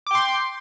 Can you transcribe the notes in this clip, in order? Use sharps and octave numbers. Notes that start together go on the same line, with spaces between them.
G5 C6 D6